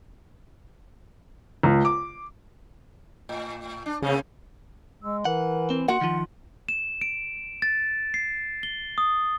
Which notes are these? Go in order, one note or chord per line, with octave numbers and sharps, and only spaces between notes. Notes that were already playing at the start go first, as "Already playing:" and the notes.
C#2
D6
A2
D4
C#3 A#3 C4 C#4
G#3 E6
E3 A#4 F#5
C4
A#3 F#4 F#5 C6
D#3 F3
E7
D7
A6
C7
G7
D#6